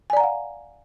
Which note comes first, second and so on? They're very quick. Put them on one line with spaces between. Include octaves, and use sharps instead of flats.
G#5 D5 A#5 F#5 F5